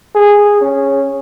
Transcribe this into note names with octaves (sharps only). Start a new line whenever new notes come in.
G#4
C#4